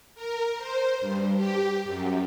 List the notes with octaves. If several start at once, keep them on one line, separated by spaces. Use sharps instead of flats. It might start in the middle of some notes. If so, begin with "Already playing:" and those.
A#4
C5
G2
G4
F#2